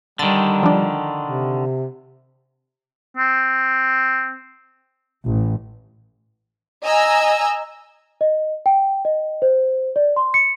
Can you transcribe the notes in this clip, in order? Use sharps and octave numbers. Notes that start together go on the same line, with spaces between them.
D3 D#3 G3 A6
F3 D4
C3
C4
A1
D#5 G#5 A#5 E6
D#5
G5
D#5
C5
D5
C6
C#7